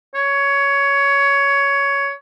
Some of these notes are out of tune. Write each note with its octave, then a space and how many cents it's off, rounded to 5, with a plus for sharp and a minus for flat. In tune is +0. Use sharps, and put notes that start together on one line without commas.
C#5 +15